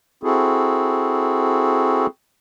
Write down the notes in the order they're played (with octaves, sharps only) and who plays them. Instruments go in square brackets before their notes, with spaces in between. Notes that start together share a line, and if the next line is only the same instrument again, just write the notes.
[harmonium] C4 E4 F#4 G#4 A4